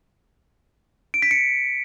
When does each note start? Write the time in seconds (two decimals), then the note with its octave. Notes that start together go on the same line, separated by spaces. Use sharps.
1.14 D7
1.22 B6
1.31 C#7